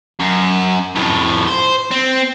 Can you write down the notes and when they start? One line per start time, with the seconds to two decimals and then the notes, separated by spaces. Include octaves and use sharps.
0.20 F#2
0.95 F2 A2
1.48 C5
1.91 C4